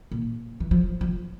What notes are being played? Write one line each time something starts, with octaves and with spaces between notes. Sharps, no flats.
A#2
E3
F3
F3